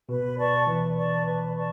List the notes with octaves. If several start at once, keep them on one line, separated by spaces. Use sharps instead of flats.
B2 B4
D5 A5 C#6
E3 B4
D5 A5 C#6
B4
D5 A5 C#6